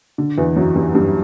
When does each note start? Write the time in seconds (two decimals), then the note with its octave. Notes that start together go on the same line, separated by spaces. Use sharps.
0.18 D3
0.37 E2 E3
0.56 F#2 F#3
0.76 G2 G3
0.95 G2 G3